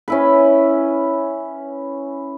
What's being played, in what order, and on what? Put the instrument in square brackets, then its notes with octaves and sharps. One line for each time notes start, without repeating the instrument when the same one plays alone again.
[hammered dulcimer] C#4 E4 B4